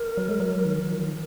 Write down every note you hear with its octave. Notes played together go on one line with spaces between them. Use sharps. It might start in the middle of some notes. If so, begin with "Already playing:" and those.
Already playing: A#4
F#3
G#3
F#3
D#3
F#3
F3
D#3